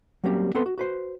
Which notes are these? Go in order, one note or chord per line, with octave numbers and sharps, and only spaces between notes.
F#3 G3 A#3 C4 C#4 G4
B3 C4 A4 B4 C6
F#4
F#4 B4 C5